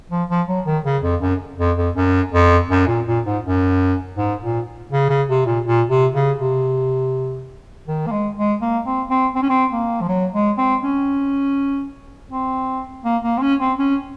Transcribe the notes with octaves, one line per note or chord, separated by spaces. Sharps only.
F3
F3
F#3
D#3
C#3
F2
F#2
F2
F2
F#2
F2
F#2
A#2
A#2
G#2
F#2
G#2
A#2
C#3
C#3
C3
A#2
A#2
C3
C#3
C3
D#3
A#3
G#3
G#3
A#3
C4
C4
C4
C#4
C4
A#3
F3
F#3
G#3
C4
C#4
C4
A#3
A#3
C4
C#4
C4
C#4